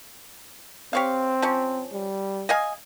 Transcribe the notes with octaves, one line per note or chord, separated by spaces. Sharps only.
C4 G4 C#5 F5
F3 C#4
G3
D#5 F5 G#5